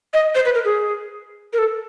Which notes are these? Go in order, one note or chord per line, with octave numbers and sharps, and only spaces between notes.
D#5
C5
B4
A#4
G#4
A#4
A4